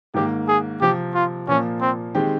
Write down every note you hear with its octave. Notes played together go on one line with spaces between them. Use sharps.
G#2 D#3 A#3 G4
G#4
C3 F3 C4 G4
F4
A#2 F3 A#3 C#4
C4
D#3 G#3 C4 G4